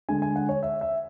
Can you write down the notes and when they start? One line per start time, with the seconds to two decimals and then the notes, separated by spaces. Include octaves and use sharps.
0.09 D3 G#3 G#5
0.22 G#5
0.36 F#5
0.49 C#5
0.63 E5
0.81 E5